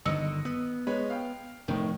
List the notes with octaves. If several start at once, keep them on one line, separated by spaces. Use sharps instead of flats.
G1 D3 D#3 D#5 E6 C#7
B3
G#3 B4 C#5
F5 G5
F1 A2 D#3